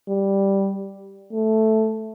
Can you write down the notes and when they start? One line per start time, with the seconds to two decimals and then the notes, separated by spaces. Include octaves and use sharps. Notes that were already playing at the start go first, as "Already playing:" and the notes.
0.09 G3
1.32 A3